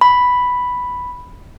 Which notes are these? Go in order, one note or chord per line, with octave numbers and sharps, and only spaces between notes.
B5